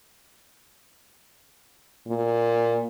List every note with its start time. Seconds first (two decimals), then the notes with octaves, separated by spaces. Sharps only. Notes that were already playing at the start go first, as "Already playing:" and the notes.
2.07 A#2